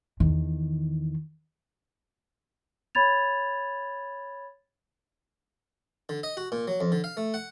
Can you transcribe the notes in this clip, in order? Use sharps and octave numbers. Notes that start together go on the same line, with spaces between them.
E2 D#3
C#5 B5 G#6 A6 F7
D3
D#5
F#4
A#2
F#3
F2
D3
F5
A3
F#5